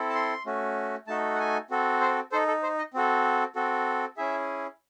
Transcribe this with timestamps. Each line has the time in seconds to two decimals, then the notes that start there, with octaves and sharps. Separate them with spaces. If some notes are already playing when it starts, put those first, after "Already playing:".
Already playing: C4 E4 A4
0.10 A5
0.15 C6
0.46 A3 C#4 F#4
1.07 A3 D#4 F#4 A4 A5
1.35 F#5
1.39 G#5
1.70 C4 F#4 A4
2.01 C5
2.32 D#4 A4 C5
2.48 A4
2.63 C5
2.78 D#5
2.94 C4 F#4 A4
3.55 C4 F#4 A4
4.17 C#4 E4 G#4 E5